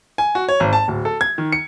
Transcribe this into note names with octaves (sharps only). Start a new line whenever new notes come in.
G#5
F#4
C#5
G#1
A5
D1
A4
G#6
D#3
C#7